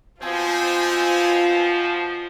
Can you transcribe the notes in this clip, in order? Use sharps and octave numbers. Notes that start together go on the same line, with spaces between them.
B2 F3 C4 F4 G#5